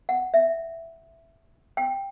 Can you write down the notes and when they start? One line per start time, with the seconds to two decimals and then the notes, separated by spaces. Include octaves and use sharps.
0.09 F#5
0.34 E5
1.77 G5